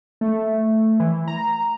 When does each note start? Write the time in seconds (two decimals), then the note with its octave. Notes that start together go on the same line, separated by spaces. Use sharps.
0.21 A3
1.00 E3
1.28 A#5